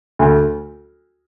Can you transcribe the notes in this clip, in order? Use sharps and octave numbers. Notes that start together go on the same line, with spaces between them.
D2